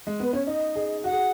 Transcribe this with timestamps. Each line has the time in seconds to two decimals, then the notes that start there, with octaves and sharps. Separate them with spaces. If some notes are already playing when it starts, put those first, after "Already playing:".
0.07 G#3
0.20 B3 B4
0.33 C#4 C#5
0.46 D#4 D#5
0.75 G#4
1.04 F#4 F#5
1.12 G#4